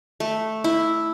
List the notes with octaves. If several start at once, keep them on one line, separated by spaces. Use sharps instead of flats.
A3
E4